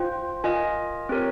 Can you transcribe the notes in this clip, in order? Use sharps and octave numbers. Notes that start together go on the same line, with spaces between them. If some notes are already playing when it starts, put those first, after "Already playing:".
Already playing: F4 C5 G5
F4 A#4 D#5 G#5
C4 G4 A#4 C#5